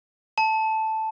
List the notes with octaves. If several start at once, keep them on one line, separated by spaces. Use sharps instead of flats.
A5